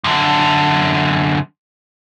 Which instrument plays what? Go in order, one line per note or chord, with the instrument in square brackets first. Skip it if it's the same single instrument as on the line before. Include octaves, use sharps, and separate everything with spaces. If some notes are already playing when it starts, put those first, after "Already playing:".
[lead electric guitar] F#2 D3